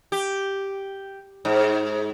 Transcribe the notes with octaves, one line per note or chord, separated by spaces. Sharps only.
G4
G#2